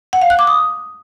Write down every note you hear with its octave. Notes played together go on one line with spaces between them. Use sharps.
F#5
F5
F#6
D6
D#6